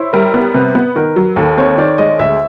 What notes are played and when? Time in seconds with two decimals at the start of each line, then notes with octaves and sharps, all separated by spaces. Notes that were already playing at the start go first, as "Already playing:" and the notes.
Already playing: E4 C5 C#5
0.13 G3 A#4
0.34 B3
0.54 C3 B4
0.75 B3
0.96 D#3 A#4
1.16 F#3
1.36 D#2 A4
1.58 C4 C#5
1.78 D#3 D5
1.98 G#3 D#5
2.19 D2 E5